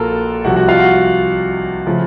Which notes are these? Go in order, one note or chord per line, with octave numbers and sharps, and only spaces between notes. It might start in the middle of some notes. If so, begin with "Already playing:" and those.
Already playing: A#1 A#2 A#3 F4 F#4 A4 A#4 A5
C2 C3 F3 F#4 F#5
F#4 F#5
F4 F5
F#4 F#5
C#3 F3 A3